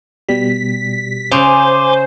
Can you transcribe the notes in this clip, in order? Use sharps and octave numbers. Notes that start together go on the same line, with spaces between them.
B2 G3 B6
C#3 C5 G#5 C6 D6